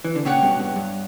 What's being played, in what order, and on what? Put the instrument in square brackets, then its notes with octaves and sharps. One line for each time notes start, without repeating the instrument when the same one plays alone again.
[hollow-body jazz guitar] E3
D3
[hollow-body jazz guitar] A#2 C#3 [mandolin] G4 C#5 F#5
[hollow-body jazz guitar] G2 B2
G2
G2